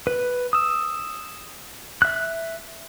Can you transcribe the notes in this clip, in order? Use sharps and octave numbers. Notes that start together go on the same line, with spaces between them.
B4
D#6 E6
E5 F#6